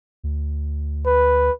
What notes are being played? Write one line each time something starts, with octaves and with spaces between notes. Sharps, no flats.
D2
B4